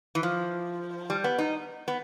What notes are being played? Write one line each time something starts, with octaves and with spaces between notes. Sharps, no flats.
E3
F3
G3
B3
D#4
B3